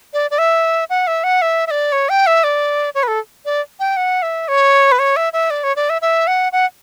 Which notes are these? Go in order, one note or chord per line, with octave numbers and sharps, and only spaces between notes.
D5
D5
E5
F#5
E5
F#5
E5
E5
D5
C#5
G5
E5
D5
C#5
B4
A4
D5
G5
F#5
E5
C#5
B4
C#5
E5
E5
D5
C#5
D5
E5
E5
F#5
F#5